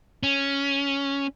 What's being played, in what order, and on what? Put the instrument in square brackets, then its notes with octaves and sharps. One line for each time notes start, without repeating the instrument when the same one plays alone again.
[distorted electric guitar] C#4